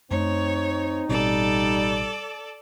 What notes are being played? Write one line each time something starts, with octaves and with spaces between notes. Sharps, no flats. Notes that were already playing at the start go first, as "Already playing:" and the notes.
F#2 A3 C4 D#4 C#5
A1 B2 G3 C4 A4 D5